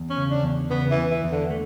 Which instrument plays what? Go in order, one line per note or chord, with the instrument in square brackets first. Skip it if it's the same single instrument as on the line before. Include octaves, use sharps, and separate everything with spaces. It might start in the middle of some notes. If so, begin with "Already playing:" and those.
Already playing: [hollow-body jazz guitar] E2
[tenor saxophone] C#4
[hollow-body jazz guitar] C#3
[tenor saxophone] D4
[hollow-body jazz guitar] E2
[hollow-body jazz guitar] C#3 [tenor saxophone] B3
[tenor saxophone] E3
[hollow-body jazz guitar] E2
[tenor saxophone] E3
[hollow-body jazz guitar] E2
[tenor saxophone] D3
[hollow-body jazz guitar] A3